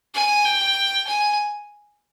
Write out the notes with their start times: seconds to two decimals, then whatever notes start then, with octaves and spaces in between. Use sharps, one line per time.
0.14 G#5
0.45 G5
1.07 G#5